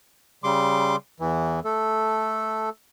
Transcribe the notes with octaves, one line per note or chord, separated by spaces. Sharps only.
C#3 G3 C6 D6
E2 E3
A3 A4